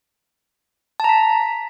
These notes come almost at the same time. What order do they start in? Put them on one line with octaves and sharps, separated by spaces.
A5 A#5 B6